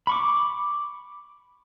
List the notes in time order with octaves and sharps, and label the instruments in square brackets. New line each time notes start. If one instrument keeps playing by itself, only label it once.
[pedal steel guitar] B5 C#6 D6